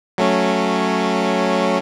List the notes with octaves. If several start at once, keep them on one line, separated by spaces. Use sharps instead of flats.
F#3 A3 C#4